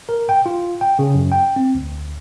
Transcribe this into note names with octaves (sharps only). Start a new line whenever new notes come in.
A#4
G5
F4
G5
C#3
F#2
G5
C4
D2